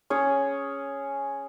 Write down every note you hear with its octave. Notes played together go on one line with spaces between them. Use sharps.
C#4 G#4 C#5